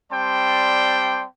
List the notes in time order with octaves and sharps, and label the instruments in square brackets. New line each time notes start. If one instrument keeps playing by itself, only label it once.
[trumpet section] G3 C4 D5 G5 A5 C6